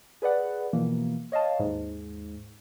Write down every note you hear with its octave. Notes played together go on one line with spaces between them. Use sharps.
G#4 B4 D5 F#5
B2 E3 F3 A#3
C#5 D#5 F5 A5
D#2 G#2